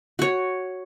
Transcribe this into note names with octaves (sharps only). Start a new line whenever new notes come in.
F#4 C#5